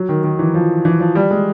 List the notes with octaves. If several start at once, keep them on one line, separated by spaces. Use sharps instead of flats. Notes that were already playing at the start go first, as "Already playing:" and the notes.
Already playing: F#3
D#3
D#3
E3
F3
E3
F3
G3
G#3